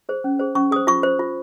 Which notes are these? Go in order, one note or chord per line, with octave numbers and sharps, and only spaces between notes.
G#4 C5
C#4
G#4 C5
C#4 C#6
G#4 C5 D#6
F4 C#6
C5
F4